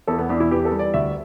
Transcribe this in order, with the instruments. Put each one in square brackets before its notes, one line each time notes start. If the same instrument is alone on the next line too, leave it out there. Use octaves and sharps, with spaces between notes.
[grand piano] E2 A4
B3
E2 D4
E4
E3 G4
A4
G3
D5
D2 E5